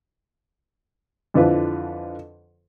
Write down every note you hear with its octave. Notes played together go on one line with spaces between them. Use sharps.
F2 D3 E3 F3 B4